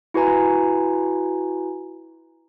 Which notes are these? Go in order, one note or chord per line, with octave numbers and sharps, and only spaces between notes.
E4 F#4 B4 G#5 A#5